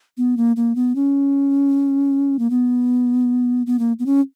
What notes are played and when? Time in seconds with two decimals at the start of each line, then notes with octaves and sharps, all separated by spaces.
0.18 B3
0.37 A#3
0.56 A#3
0.75 B3
0.95 C#4
2.39 A#3
2.50 B3
3.67 B3
3.79 A#3
3.99 B3
4.06 C#4